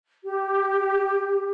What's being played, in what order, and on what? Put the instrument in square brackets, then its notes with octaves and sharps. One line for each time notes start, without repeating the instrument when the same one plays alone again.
[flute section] G4